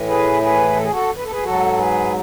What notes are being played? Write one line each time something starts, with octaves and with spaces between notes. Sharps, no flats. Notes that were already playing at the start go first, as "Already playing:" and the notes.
Already playing: A2 E3
G#4 B4
G#4 B4
A4
G#4
F#4 A4
B4
A4
G#4 B4
G#2 F#3 F#4 A4
G#4 B4